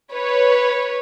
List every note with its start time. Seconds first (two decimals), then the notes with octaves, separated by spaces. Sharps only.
0.13 B4 C#5